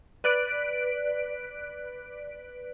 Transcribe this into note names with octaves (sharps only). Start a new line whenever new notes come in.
B4 D5 F#6 D7